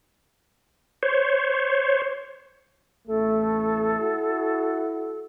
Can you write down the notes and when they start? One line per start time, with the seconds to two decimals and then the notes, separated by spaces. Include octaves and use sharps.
1.03 C5 C#5
3.08 A1 E2 A3 A4
4.00 E4 F#4